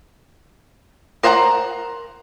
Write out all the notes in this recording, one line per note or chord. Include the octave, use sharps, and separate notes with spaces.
A#4 C5 F#5 G#5 A#5